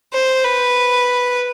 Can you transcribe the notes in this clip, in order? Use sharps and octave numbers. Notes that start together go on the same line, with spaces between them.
C5
B4